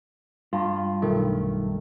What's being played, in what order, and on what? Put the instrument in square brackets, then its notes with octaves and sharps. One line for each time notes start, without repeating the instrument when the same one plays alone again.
[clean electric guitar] G2 [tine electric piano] F4
[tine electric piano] B1 D#3 A3